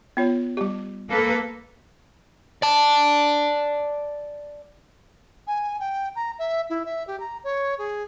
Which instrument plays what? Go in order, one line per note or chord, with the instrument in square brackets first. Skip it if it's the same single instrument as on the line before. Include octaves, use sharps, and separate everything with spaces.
[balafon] B3 F4 C#5
G3 G4
[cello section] A#3 A4 B4
[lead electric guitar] D5 A5
[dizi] G#5
G5
A#5
E5
E4
E5
G4
A#5
C#5
G#4